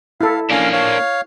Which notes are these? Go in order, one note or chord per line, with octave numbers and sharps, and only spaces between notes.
E4 A4 F5
A#3 C#4 D4 F5 G#5
C#5 F5